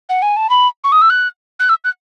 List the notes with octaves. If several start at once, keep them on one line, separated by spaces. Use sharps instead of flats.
F#5
G#5
A5
B5
C#6
D#6
E6
F#6
F#6
E6
F#6